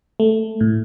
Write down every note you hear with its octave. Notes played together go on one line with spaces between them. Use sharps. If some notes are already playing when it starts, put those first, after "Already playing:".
A3
A2